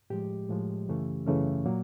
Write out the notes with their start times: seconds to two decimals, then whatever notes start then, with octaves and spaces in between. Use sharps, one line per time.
0.10 A2 F3 G#3 G4
0.49 A2 F3 G#3
0.88 F#2 C#3 E3 A3 C#4
1.27 F#2 C#3 E3 A3 C#4
1.65 A#2 F#3 A#3